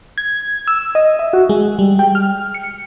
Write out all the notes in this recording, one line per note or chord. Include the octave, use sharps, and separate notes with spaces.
G#6
E6
D#5
E5
F#4
G#3
G3
G5
F6
C#7